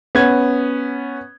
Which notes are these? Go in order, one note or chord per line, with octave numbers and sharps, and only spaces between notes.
B3 C#4 G#6